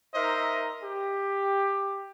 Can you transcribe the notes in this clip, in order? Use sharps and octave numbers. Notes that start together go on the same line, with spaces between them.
D#4 A#4 C5 D#5 E5
G4